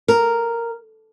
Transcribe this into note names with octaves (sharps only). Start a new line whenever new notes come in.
A#4